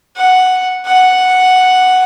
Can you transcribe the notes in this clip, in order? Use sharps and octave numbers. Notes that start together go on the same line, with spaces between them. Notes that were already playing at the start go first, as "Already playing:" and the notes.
F#5
F#5